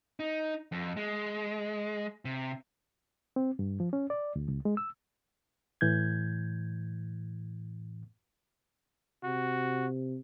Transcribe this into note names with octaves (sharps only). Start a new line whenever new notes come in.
D#4
F2
G#3
C3
C4
G2
F3
C#4
D5
D2
C#2
G#3
E6
A2 E3 G6 G#6
C3 F#4